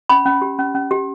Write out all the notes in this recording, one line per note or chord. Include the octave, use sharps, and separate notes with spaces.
C#4 B5
C#4
G4
C#4
C#4
G4